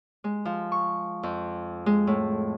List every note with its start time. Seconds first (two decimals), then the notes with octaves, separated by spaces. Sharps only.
0.24 G#3
0.45 F3
0.72 C#6
1.23 F2
1.86 G#3
2.07 A2